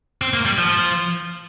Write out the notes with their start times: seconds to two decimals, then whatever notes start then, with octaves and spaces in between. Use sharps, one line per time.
0.22 C4
0.34 A#3
0.45 G3
0.58 F3